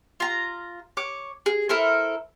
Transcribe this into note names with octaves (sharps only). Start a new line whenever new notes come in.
F4 A#5
C#5 D6
G#4
E4 A4 A#4 C5